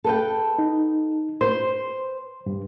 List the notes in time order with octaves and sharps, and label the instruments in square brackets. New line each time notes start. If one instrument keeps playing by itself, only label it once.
[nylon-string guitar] A4 B4 G5
[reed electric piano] D#4
[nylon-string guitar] B4 C5 [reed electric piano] C6
[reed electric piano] G2